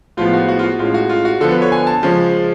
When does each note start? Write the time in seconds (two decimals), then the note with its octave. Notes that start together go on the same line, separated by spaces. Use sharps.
0.17 A2 F3 G#3 B3 F4
0.33 F#4
0.48 F#4
0.59 F4
0.64 F#4
0.79 A2 G#3 C#4 F4
0.94 F#4
1.09 F4
1.25 F#4
1.40 D3 F3 B3 A4
1.51 B4
1.62 C#5
1.72 G#5
1.87 A5
2.03 C#3 F3 G#3 C#4